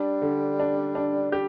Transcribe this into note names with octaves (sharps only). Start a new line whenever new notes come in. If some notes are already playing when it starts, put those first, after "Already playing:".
Already playing: G3 D4
D3
D4
D4
G3 G4